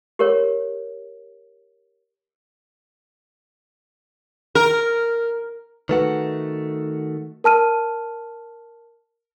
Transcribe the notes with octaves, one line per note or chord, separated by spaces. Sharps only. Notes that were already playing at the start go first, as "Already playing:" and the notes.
G4 A#4 C#5
A#4
D#3 A3 F#4 B4
A#4 A5 F6 D#7